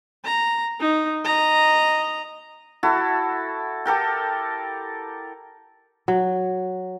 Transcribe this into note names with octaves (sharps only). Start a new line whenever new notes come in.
A#5
D#4
D#5 A#5
E4 F#4 A4
G4 A4 A#4 G5
F#3